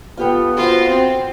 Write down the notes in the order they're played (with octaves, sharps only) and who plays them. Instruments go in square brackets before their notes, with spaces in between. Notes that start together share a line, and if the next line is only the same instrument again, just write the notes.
[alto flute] B3 [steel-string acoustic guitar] F4 G4 A4
[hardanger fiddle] F4 C5 [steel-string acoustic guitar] F#4
[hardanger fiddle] C4